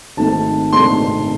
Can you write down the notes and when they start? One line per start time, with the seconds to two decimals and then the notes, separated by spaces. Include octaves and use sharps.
0.17 G#1 G#2 D#3 A3 C4 A5
0.72 G#1 G#2 D#3 A3 C4 C6